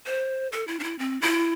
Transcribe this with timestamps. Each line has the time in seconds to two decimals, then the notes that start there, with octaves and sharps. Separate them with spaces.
0.06 C5
0.52 A4
0.67 E4
0.80 D4
0.84 E4
0.99 C4
1.22 E4